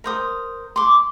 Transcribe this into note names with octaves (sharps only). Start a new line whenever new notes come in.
A#4 C5 D#6
C6 D6